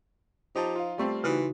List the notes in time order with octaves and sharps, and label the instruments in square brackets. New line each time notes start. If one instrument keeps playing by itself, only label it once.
[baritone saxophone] F3 [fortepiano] D#4 [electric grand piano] G4 A5
[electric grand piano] F4 F5
[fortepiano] G3 A3 C4
[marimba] C#3 D#4 F#4 [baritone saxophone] E3